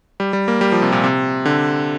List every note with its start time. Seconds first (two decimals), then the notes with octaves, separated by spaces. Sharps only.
0.20 G3
0.33 G3
0.48 A#3
0.61 G3
0.72 F3
0.82 C3
0.93 A#2
1.04 C3
1.45 D3